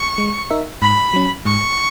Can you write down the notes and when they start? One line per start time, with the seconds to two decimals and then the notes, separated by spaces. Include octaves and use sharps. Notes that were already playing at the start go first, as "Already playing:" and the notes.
Already playing: C#6
0.18 G#3
0.50 D#4 A#4 E5
0.82 G#2 B5
1.13 F#3 C#4
1.45 G#2 C#6